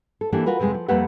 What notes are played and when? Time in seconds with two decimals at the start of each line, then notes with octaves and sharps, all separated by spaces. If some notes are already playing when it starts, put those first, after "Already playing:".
0.21 A4
0.32 E3 A3 A#3 D4 G4
0.46 F4 F#4 A#4 B4
0.59 F2 C3 F3 G#3 A3
0.74 F3
0.88 F2 G3 A3 A#3 B4 F#5